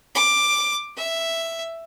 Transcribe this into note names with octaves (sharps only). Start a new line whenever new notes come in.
D6
E5